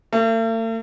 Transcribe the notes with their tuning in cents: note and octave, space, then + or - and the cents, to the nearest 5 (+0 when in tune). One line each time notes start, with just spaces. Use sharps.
A3 +45